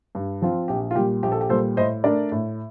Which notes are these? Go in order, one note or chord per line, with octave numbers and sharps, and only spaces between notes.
G2
F3 C4 F4
A#1 G4
F4
A#2 G3 G4
A#1 G4
A4
G4
A#2 G3 A4 C5
A2 C5 D#5
A3 D4 A#4 D5
A2